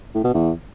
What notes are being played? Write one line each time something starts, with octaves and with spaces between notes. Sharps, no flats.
A2
B2
E2